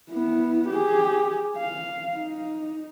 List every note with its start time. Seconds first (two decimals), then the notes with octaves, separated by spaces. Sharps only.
0.11 B3 E4
0.69 G4 G#4
1.57 F5
2.16 D#4